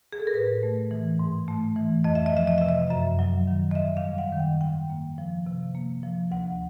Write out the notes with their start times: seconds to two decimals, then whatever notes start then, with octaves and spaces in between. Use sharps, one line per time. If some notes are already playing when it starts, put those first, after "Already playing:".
0.12 G#4
0.20 A4
0.27 A#4
0.34 A2 B4
0.63 A3
0.91 E3
1.19 G#2
1.48 A3
1.76 E3
2.04 F2 D#5
2.15 E5
2.26 D#5
2.33 F3 E5
2.48 D#5
2.58 C3 E5
2.68 D#5
2.90 F#2 E5
3.19 F#3
3.47 D#3
3.71 D#5
3.75 G#2 E5
3.97 F5
4.04 G3
4.18 F#5
4.32 D#3
4.40 G5
4.61 G#2 G5
4.90 A#3
5.18 F3
5.46 C3
5.75 A#3
6.03 F3
6.31 D2 F#5